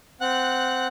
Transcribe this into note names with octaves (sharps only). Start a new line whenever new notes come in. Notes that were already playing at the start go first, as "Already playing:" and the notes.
C4 F#5 F#6